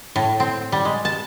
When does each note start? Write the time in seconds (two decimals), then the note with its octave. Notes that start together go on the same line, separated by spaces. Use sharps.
0.16 A2
0.40 C4
0.72 G3
0.85 G#3
1.05 A5